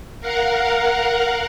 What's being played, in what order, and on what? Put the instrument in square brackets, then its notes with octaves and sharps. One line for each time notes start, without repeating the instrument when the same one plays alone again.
[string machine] A#4 F5 F#5